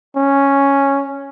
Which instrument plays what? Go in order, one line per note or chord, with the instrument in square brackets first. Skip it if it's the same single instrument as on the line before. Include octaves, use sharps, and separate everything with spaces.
[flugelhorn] C#4